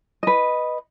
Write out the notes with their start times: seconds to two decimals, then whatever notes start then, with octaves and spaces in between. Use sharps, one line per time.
0.23 B4 D#5